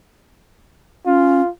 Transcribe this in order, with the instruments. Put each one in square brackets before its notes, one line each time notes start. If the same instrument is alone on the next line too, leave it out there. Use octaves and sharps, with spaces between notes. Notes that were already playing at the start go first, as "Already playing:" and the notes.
[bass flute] C#4 [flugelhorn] F4